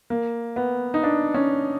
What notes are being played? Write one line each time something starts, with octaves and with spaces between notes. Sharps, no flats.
A#3
B3
D#4
D4
C#4